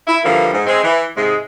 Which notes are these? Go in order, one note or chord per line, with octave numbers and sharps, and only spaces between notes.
E4
D3 E3 F3 G3 A#3
G#2
G#3 C4
E3
G#2 C3 G#3